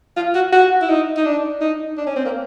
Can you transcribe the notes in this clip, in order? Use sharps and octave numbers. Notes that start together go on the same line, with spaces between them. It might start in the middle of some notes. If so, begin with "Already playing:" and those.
F4
F#4
F#4
E4
D#4
D#4
D4
D#4
D4
C#4
C4
A#3